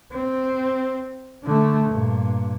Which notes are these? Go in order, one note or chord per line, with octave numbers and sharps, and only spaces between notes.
C4
D3 A3
G2 A#2